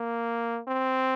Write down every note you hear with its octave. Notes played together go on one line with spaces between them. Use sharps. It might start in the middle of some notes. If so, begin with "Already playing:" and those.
Already playing: A#3
C4